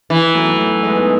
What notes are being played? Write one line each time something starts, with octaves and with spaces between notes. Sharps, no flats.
E3
F#3 A3
F#3 A3
G#3 B3
D#4